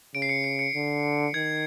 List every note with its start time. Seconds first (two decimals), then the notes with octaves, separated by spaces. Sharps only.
0.14 C#3 D7
0.22 C7
0.29 C#7
0.44 C#7
0.59 C#7
0.75 D3
1.34 D#3 G#6